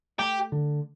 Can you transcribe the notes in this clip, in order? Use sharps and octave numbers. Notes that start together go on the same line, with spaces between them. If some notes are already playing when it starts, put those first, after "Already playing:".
A3 G4
D3